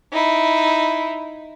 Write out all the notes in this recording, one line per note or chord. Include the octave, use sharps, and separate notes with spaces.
D#4 E4